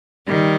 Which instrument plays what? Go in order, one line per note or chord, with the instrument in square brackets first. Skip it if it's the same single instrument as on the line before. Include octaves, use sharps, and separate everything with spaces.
[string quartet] D#3 G3